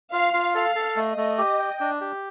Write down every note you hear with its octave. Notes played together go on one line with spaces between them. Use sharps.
F4 F5
F4
A4 F5
A4
A3 D#5
A3
G4
G5
D4
G4